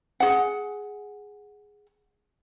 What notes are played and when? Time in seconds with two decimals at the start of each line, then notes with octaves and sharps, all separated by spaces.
0.20 G#4 F#5